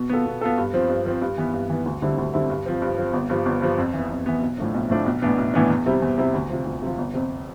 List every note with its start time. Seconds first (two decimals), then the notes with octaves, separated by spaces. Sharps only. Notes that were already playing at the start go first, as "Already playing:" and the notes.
Already playing: B2
0.09 B3 F4 A4
0.26 B2
0.41 B3 F4 A4
0.58 G2
0.73 F3 C4
0.89 G2
1.06 F3 C4
1.22 G2
1.38 E3 B3
1.54 G2
1.70 E3 B3
1.86 D2
2.02 D3 G3 C4 E4
2.18 D2
2.34 D3 G3 C4 E4
2.50 G2
2.66 F3 C4
2.82 G2
2.98 F3 C4
3.14 G1
3.30 G2 F3
3.46 G1
3.62 G2 F3
3.78 F2
3.94 E3 B3
4.10 F2
4.26 E3 B3
4.42 B1
4.58 A2 F3 A3 D4
4.74 B1
4.90 A2 F3 A3 D4
5.06 B1
5.22 A2 E3 B3 D4
5.38 B1
5.54 A2 E3 B3 D4
5.70 E2
5.86 C3 G3 C4 E4
6.02 E2
6.18 C3 G3 C4 E4
6.34 D2
6.50 C3 F3
6.66 D2
6.82 C3 F3
6.98 G1
7.14 F2 C3